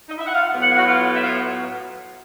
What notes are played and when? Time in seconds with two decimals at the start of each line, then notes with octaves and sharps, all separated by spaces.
0.09 D#4 D#5
0.17 E4 E5
0.27 F#5
0.35 F4 F5
0.53 A2 F#3 B3
0.61 F#5
0.69 F5
0.77 F#4 F#5
0.88 F4 F5
1.15 E5
1.23 F4 F5